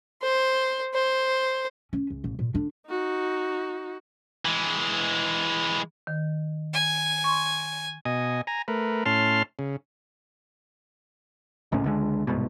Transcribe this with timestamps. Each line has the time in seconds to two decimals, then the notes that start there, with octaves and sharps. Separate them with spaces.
0.22 C5
0.94 C5
1.93 C#4
2.10 C#2
2.24 A1
2.39 A#2
2.54 D3 D4
2.89 D#4 F#4
4.45 E3 G#3
6.07 D#3
6.73 G#5
7.24 C6 C#6
8.05 B2 D#5 G#5
8.47 G#5 A#5
8.68 A3 A#4 B4
9.06 A2 C#4 A5 C6 F6
9.59 C#3
11.72 G#1 C#2 A2 C#4
11.84 C#2 D3 G#3
12.27 D1 C2 G#2 B2